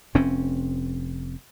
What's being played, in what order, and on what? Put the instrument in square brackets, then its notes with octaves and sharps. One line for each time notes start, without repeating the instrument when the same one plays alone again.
[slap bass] F1 C4 C#4